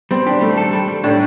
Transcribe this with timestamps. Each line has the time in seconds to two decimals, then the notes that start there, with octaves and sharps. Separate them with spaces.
0.11 G3 C4
0.27 D4 G4
0.41 G3 A3
0.57 A4
0.73 G3
0.88 G3
1.03 A2 D4